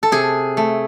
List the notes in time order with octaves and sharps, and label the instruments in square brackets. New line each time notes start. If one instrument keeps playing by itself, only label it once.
[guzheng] A4
C3 G#4
A3